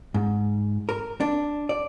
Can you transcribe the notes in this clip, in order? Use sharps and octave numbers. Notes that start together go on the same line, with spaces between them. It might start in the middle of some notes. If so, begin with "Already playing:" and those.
G#2
A#4
D4
D5